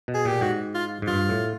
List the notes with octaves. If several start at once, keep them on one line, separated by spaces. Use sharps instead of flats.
B2
G#4
A#2 G4
G#2 F#4
F4
G#2
G2 F4
A2